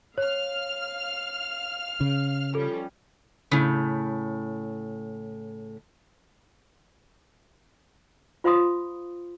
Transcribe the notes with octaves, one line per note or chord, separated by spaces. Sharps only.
C#5 F5 F6
C#3
F3 G3 C#4 A4
A2 C#3
F4 C5 F5 B5 C6 D#6